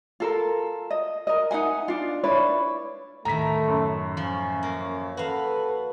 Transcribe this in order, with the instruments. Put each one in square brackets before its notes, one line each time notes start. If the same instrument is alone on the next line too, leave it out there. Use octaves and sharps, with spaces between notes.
[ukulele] F4 A4 A#4
D#5
A#4 D#5
D#4 E5 F#5 G#5
D4 F4
D4 E4 B4 C#5
[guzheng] A2 D#3 [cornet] A3 [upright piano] A#5 B6
[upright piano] F#2
[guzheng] F3 [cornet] C#4
[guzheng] A#3
[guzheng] F#4 F5 [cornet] A4 [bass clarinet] B4